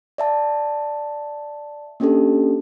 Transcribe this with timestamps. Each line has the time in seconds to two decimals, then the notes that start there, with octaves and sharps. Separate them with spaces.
0.18 D5 E5 A5
2.00 A#3 C#4 D4 G4 A4